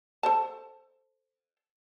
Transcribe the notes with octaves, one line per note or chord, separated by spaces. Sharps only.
A4 C5 A5